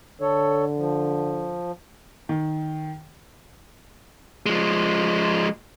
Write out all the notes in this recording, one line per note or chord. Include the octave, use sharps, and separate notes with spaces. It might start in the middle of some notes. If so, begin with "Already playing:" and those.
D3 A4 C#5
F3
D#3
F3 G#3